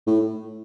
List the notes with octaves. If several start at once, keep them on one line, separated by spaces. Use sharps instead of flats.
A2